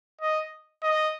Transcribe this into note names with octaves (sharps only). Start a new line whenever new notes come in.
D#5
D#5